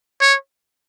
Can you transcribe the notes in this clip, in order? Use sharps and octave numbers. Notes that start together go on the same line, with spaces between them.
C#5